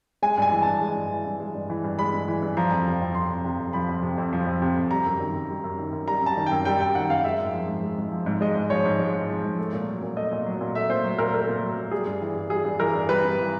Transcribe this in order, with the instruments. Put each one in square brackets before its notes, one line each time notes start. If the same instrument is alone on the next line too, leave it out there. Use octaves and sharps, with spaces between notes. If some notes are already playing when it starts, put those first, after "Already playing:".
[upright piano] G#3 G#5
G2 G#5
E3
G2 A5
G#3
G2
E3
G2
G#3
G2
E3
G2
G#3 B5
G2
E3
G2
F3 A#5
F2
C3
F2
F3 C6
F2
C3
F2
F3 B5
F2
C3
F2
F3
F2
C3
F2
G3 A#5
F#2
D#3
F#2
G3
F#2
D#3
F#2
G3 A#5
F#2 A5
D#3
F#2 G5
G3 G5
F#2 G5
D#3 F#5
F#2 F5
G#3 E5
G#2
F3
G#2
G#3
G#2
F3
G#2
G#3 D#5
G#2
F3 C#5
G#2
G#3
G#2
F3
G#2
A3
A#2
F#3
A#2
A3 D#5
A#2
F#3
A#2
A3 E5
A#2 C5
F#3
A#2 A#4
A3 A#4
A#2
F#3
A#2
G3 G#4
G2
E3
G2
G3 G#4
G2
E3 A#4
G2
G3 B4
G2
E3